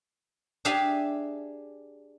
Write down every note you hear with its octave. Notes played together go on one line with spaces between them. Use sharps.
D4 G4 G#4 E5 F5 G#5